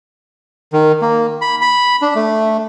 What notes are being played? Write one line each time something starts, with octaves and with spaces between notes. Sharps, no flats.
D#3
A#3
B5
B5
D4
A3